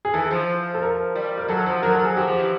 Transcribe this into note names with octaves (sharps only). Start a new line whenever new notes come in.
G#4
E3 A4
F3
A4
A#4
G3
A#4
F#3 A4
F3
F#3 A#4
A4
F#3
G#4
F3 G4
F3
E3